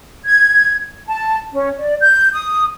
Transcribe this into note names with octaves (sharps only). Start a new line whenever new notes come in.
G#6
A5
C#4
D5
G6
D#6